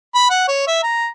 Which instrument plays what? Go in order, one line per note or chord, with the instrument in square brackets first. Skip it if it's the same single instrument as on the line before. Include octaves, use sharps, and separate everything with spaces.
[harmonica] B5
F#5
C#5
E5
A#5